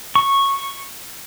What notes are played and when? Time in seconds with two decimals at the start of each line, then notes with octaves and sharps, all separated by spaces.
0.15 C#6